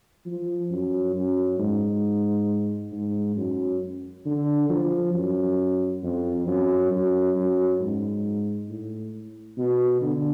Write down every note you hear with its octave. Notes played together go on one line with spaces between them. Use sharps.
F3
F#2
F#2
G#2
G#2
F#2
D3
F3
F#2
F2
F#2
F#2
F#2
G#2
A2
B2
D3